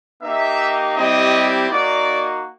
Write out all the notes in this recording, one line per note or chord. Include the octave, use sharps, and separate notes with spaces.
A#3 D#4 G4 E5
G3 C4 E4 G4 D#5
A#3 D#4 F#4 D5